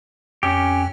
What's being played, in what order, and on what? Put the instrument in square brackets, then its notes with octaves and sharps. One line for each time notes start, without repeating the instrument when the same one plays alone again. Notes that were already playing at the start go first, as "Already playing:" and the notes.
[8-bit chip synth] F2 [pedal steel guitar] C#4 G4